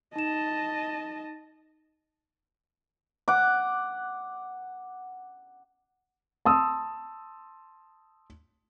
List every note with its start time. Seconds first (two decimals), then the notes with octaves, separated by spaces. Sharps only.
0.16 D#4 D#5 A5 E7
3.28 F#5 D6
6.45 A5 C6 D#6 E6